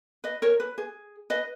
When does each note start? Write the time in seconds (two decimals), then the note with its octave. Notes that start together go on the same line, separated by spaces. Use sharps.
0.24 B4 D#5
0.42 A#4 C#5
0.60 B4
0.78 G#4
1.30 B4 D#5